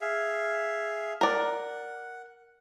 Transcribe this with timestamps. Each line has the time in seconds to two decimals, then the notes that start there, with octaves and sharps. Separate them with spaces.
0.01 G#4 E5 F5
1.21 A#4 D5 F#5